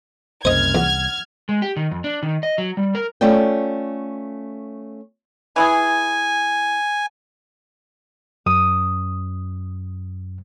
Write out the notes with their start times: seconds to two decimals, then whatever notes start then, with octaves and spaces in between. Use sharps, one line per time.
0.45 F#1 C2 C5 D#5 F6 G#6
0.75 E2 F#5
1.49 G#3
1.62 G4
1.77 D#3
1.91 F2
2.04 D4
2.23 D#3
2.43 D#5
2.58 F#3
2.77 G3
2.95 A#4
3.21 A3 C#4 F4 D5 G5
5.56 E3 E4 G#4 G#5
8.46 F#2 D#6